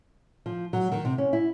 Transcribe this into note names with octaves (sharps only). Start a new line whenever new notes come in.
F3
F#3
D#3
C3
C#4
E4